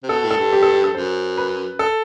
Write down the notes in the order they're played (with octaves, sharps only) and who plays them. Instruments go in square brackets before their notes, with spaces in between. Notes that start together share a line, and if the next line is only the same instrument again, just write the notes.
[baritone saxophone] C3
[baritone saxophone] B2 [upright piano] A4
[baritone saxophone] A2
[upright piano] A4
[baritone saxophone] G2
[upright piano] G4
A4
G4
A4
[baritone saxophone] F#2 [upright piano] C5
[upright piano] B4
A4